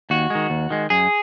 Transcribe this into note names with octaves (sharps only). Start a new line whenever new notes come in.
D#2 F#4
D#3 G#3
D#2
D#3 G#3
F#2 G#4